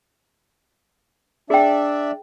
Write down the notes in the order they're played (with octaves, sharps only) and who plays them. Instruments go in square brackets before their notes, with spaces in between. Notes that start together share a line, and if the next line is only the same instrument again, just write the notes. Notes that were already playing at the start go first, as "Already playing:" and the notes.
[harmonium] D4 D5 E5 [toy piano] G#4 G5